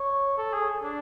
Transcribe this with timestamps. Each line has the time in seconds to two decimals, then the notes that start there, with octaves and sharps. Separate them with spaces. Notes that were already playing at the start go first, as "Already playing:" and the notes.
Already playing: C#5
0.38 A4
0.53 G#4
0.84 D4